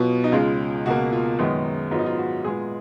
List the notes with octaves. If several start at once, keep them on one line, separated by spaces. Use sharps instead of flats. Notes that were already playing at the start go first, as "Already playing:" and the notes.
Already playing: B2 F#3 B3 F4
D#4
C#2 C#3 G#3 F4
C#2 B2 A#3 F#4
F4
F#2 D#3 G#3 B3 D#4
G#2 F#3 B3 F4
D#4
F4
F#4
A#2 G#3 B3 G#4